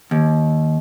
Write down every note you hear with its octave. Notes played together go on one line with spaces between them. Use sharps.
D#2